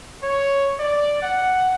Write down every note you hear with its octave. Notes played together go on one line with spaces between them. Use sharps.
C#5
D5
F#5